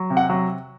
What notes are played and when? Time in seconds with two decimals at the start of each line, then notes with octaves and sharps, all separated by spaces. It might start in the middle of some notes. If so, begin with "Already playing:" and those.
Already playing: F#3
0.10 C3
0.17 F#5
0.30 F#3